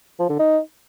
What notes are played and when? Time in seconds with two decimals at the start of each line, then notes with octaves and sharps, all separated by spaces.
0.19 F3
0.29 D3
0.39 D#4